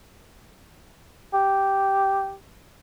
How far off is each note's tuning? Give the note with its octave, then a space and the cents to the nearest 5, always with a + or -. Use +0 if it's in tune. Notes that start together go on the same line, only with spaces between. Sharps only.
G4 -5